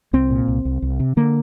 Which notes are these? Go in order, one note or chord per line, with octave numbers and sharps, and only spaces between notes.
C2 C4
A#2
C2
C2
C2
C3
D3 A#3